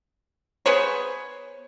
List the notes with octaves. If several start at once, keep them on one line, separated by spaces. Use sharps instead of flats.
B3 G#4 C5 C#5